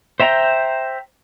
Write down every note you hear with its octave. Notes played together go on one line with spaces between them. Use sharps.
C5 E5 G5 A#5